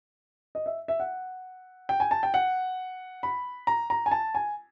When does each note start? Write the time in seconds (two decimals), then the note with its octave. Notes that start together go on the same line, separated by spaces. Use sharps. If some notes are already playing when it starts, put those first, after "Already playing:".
0.55 D#5
0.66 E5
0.88 E5
1.00 F#5
1.89 G5
2.00 G#5
2.11 A5
2.23 G5
2.34 F#5
3.23 B5
3.67 A#5
3.90 A#5
4.06 G#5
4.11 A5
4.35 G#5